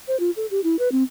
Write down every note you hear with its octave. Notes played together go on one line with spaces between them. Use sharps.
C5
F4
A4
G4
E4
B4
C4